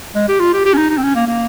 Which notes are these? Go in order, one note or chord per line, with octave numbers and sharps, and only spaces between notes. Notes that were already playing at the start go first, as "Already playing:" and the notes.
G#3
G4
F4
G4
G4
C#4
D#4
D#4
C4
C#4
A#3
A#3